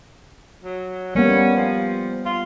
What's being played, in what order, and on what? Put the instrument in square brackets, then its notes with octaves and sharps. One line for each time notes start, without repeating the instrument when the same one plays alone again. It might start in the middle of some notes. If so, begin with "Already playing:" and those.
[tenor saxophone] F#3
[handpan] G3 A#3 B3 [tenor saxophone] C#4
[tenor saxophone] F3
F4